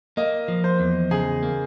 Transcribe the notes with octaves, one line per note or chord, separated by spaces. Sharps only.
A#3 D#5
F3
C5
E2
C#3 G#4
A#3